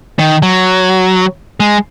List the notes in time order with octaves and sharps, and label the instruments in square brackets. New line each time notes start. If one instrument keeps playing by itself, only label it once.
[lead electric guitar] D#3
F#3
G#3